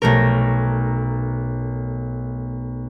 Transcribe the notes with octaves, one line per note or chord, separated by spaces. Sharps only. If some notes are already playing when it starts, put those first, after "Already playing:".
B1 A3 A#4